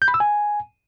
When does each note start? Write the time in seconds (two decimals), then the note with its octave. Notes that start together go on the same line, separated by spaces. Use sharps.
0.02 G6
0.08 B5
0.14 E6
0.20 G#5